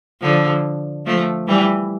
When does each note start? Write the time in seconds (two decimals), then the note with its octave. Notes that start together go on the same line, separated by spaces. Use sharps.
0.22 D3 F3
1.06 F3 A3
1.48 E3 G3